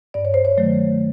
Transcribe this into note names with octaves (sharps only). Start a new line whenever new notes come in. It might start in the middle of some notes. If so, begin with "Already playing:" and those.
G2 D5
C#5
C5
C#5
D#3 F#3 A3